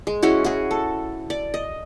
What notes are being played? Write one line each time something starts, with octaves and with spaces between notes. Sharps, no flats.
G#3
G#3 C#4 E4 F#4
F#4 G#4
A4
D5
D#5